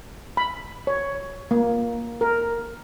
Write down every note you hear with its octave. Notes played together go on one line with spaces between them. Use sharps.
B5
C#5
A#3
A#4